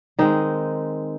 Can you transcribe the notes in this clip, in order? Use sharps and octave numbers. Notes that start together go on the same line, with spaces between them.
D#3 G#3 C4 D#4